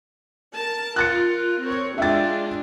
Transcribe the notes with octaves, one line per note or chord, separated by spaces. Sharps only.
A#4 A5
F4 A#4 F#6 A6 C#7
C4 A#4 C#5
G#3 D4 F4 E5 G5 A6